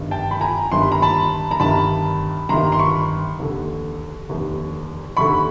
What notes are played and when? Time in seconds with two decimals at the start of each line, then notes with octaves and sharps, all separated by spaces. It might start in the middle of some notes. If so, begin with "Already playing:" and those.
Already playing: G1 G2 D#3
0.11 G5 A5
0.31 B5
0.41 G#5 A#5
0.72 G1 G2 D#3 C6
0.81 B5
0.92 A#5
1.02 A5 B5
1.51 A#5
1.60 G1 G2 D#3 A5 B5
2.49 G1 G2 D#3 A#5 C6
2.72 C6
2.79 B5 C#6
3.39 F1 D#2 D3
4.27 F1 D#2 D3
5.17 F1 D#2 D3 B5 C#6